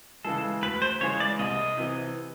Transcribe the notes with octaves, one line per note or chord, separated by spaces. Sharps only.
C#3 E3 G#3 A4
D2 B4
C5
C#3 E3 G#3 C#5
D5
C2 D#5
C3 E3